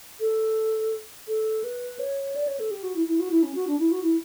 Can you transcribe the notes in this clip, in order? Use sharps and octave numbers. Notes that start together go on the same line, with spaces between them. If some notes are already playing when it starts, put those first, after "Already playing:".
A4
A4
B4
C#5
D5
C#5
A4
G4
F#4
E4
E4
F#4
E4
C#4
F#4
D4
E4
F#4
E4